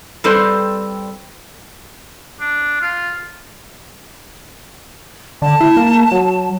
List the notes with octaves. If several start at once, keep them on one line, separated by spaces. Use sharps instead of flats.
G3 C4 A4 B4 C5 D5
D4
F4
D3 A5
E4
A#3
F#3